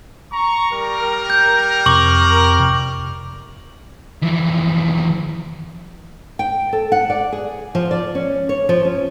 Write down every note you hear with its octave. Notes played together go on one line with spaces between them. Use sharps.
A#5 C#6
G3 A#4
G6
F2 C3 C#6 D6 F#7
F2 E3
G5
A4
F#5
D5
G#4
F3
D5
C#4
C#5
F3
C#4